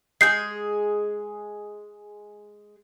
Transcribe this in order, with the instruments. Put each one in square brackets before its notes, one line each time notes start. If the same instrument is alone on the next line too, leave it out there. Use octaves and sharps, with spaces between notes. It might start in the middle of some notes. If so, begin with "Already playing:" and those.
[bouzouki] G#3 G#4 [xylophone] G6 C7